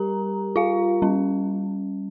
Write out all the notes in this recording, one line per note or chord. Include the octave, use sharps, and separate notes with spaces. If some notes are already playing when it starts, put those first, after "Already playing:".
Already playing: G3 G4 A#4 A#5
F4 F5
G3 C#4